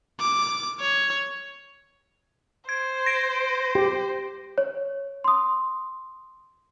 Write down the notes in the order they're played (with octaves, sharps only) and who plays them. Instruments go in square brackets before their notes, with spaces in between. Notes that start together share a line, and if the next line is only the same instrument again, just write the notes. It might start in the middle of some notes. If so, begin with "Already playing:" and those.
[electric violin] D6
C#5
[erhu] C5 [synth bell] G#6
[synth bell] A#6 D7
[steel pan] G4
[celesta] C#5
C6 D#6